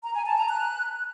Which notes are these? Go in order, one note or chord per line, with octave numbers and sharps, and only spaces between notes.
A#5
G#5
A5
A#5
F#6